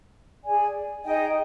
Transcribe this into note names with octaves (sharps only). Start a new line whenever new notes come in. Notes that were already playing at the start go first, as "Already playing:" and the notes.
G#4 D5 G#5
D#4 G#4 D#5 G5